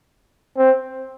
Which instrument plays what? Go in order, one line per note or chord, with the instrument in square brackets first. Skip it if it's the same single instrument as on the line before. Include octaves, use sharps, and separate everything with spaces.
[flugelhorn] C4